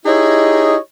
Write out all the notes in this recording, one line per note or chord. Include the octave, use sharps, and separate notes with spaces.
D#4 E4 G4 G#4 C#5 D#5